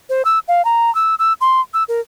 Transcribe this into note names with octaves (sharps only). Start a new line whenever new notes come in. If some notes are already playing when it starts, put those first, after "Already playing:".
C5
E6
F5
A#5
E6
E6
C6
E6
A#4